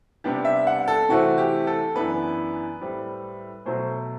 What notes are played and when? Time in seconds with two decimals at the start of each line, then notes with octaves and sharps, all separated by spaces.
0.24 C3 G3 B3 D4 G4
0.45 E5
0.67 F#5
0.88 A4
1.09 C3 E3 A3 C4 F#4
1.38 G4
1.67 A4
1.94 F#2 E3 B3 D4 B4
2.81 A2 G3 C4
3.66 B2 F#3 A3 C5